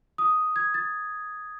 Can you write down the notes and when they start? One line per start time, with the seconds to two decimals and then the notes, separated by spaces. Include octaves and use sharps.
0.18 D#6
0.56 G#6
0.74 A6